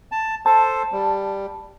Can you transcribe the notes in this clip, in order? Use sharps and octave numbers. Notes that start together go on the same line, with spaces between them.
A5
A4 C5 A5
G3